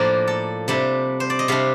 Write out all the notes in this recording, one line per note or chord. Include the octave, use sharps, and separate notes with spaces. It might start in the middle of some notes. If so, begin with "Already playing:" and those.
Already playing: A2 F3 A#3 D4 A#4 C5
A4
C3 G3 D4
C5
D5
D#5
C3 G3 D4 F5